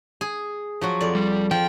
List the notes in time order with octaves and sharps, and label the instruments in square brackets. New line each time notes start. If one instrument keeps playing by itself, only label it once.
[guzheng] G#4
F3 F#3 F#4
F2 D5
[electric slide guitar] G3
[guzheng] F3 [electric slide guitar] G5